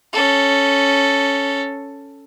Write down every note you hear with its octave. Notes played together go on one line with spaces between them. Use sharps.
C#4 A4